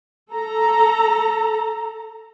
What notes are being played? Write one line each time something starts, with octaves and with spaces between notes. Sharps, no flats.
A4 A#5